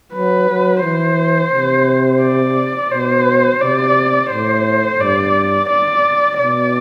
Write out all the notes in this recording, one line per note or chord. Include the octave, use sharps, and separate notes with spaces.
F#3 B4
F#3
E3 C5
C3
D5
B2 C5
C3 D5
A2 C5
G2 D5
D5
B2 D5